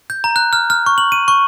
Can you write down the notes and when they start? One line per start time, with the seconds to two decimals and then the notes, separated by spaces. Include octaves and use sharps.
0.10 G6
0.24 A#5
0.36 F#6
0.53 F6
0.70 F6
0.86 C#6
0.98 F#7
1.12 D#7
1.28 C#6